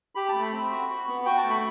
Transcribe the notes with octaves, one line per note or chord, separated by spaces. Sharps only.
G4 B5
A3 A5
B5
C4
F#4
F#4
B3
F#4 G5
A5
A3
B5